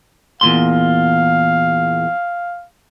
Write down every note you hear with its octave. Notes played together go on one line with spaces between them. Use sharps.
E2 A#2 F5 C6